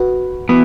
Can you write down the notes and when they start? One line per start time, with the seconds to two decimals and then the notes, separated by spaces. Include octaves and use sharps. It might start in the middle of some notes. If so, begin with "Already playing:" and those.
Already playing: F#4 B4
0.49 E3 B3 F#4 B4